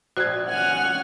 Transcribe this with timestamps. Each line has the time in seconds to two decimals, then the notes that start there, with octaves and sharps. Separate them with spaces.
0.17 A#1 F#4 C5 F#6 G#6
0.48 C#4 F#5 G#5 F6